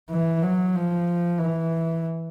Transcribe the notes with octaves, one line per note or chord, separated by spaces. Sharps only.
E3
F#3
F3
E3